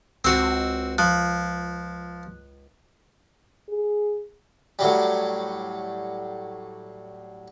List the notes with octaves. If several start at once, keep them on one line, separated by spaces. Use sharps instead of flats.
C#2 C4 F#4 E6
F3 F#6
G#4
A2 F#3 G3